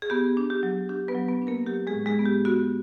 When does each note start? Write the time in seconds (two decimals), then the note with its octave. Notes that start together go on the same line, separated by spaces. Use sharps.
0.02 G#4
0.10 B3 G4
0.37 D4
0.50 G4
0.63 F#3
0.89 D4 G4
1.08 B3 B4
1.15 F#3
1.28 B3 B4
1.42 D4
1.47 A#3 A#4
1.67 F#3 G4
1.87 G#3 G#4
1.94 A2
2.06 G#3 G#4
2.19 B3
2.25 G4
2.45 B3 F#4